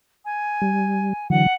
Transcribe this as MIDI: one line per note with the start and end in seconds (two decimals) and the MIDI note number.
0.25 1.28 80
0.62 1.13 55
1.30 1.46 50
1.30 1.46 52
1.30 1.46 54
1.30 1.54 78